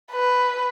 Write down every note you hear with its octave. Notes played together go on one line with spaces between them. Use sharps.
B4